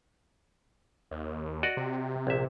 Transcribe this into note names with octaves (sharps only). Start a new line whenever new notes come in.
D#2
F#4 D5 D#5
C3
A#1 E5